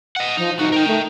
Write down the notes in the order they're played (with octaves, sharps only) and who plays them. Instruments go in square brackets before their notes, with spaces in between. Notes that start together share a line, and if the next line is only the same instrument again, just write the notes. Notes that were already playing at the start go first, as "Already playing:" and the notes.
[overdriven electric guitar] D#5 F#5
[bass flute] F3 [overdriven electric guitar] D#4
[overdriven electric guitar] C2 F#4 [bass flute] D#4
[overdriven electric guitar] A#4 G5
[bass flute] A3